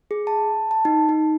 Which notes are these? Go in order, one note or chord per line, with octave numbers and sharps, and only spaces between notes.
G#4
A5
A5
D#4
D#4